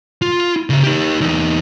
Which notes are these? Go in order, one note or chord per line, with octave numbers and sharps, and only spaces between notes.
F4
C#3 E5
D#4 G4
E2 D#4